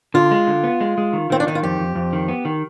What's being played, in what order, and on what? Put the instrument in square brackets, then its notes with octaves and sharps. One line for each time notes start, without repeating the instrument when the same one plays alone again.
[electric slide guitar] D3 [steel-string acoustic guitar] F4
[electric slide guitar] G#3
D3
B3
G#3
G#3
D#3
[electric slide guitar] D#3 [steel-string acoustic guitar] C4
[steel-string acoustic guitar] D4
[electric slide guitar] D#3 [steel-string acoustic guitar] D#4
[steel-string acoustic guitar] F4
[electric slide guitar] F2 [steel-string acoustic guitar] G4
[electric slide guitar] F2
F2
D#3
B3
D#3